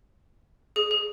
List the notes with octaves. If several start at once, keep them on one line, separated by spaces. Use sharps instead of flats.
G#4
G#4